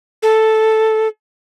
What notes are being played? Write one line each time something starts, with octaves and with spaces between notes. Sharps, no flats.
A4